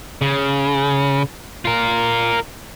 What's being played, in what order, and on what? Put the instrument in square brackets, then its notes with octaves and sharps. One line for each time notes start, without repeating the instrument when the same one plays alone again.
[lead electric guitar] C#3
F4 A#4